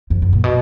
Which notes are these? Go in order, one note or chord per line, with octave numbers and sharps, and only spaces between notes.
F2
F#2
A#2
B2